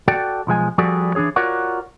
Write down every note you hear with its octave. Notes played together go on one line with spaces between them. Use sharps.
F#4 A4 D5 G5
B1 F3 G#3 G#5
F3 G3 F#4 G#4 A4 D5
E3 D4 D#4 G#4 C#5
F4 F#4 A#4 C#5 D5 F#5